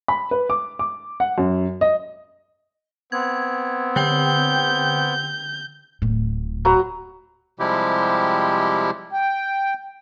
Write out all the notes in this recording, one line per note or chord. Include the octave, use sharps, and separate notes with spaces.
B5
B4
D6
D6
F#5
F#2
D#5
B3 C4 G#6
D3 G5 G6
D1 A2
F#3 B4 A#5
C3 F3 G3 G#3 E4 G4
G5